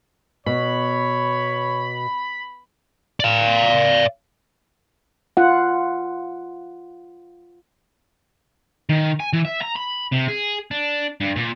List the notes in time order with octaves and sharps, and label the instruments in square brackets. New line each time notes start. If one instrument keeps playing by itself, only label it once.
[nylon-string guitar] B2 [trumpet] C#5 [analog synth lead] B5
[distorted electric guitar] D5 F5
[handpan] F4 F#5
[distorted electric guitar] D#3
G#5
E3
E5
A#5
B5
C3
G#4
D4
G2
A#2